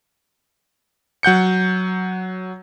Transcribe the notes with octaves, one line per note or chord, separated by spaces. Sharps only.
F#3 F#5 G6 C#7